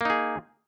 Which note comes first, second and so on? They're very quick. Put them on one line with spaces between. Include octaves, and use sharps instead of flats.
A#3 D#4 G#4